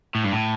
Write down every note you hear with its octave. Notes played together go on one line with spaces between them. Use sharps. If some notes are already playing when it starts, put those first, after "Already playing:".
A2
G2
A2